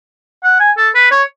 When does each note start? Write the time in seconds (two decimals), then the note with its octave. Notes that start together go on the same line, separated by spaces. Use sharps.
0.44 F#5
0.60 G#5
0.77 A4
0.95 B4
1.11 C#5